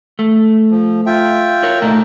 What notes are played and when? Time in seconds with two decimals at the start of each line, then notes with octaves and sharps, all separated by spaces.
0.19 A3
0.71 F3
1.06 F4 E5 G5
1.63 A#4 C#5
1.82 A#2 A3 D#4 A#4